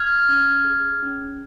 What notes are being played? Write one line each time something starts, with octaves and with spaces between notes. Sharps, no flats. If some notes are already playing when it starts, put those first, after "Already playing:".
Already playing: F6 G#6
C#4
G#4
C#4